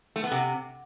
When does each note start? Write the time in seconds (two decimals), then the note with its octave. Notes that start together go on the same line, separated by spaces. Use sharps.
0.16 A3
0.24 B3
0.32 C3